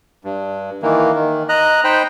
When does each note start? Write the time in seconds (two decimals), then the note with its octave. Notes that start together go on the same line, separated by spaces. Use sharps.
0.24 G2
0.83 D#3 E3 A#3
1.14 D#3
1.49 D#5 A#5 F#6
1.84 D#4 C5 G5 B5